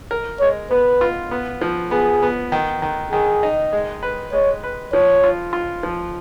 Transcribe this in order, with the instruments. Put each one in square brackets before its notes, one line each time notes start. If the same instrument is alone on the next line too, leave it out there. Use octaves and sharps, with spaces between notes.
[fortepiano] A#4
[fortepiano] G#3 [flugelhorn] C#5
[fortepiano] B3 [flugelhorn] B4
[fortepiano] F4
B3
F3
[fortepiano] B3 [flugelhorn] G#4
[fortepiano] B3
D#3
D#3
[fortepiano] D#3 [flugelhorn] G#4
[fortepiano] D#4
G#3
B4
[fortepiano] G#3 [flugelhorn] C#5
[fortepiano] B4
[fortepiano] F3 [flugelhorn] C#5
[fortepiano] F4
F4
F3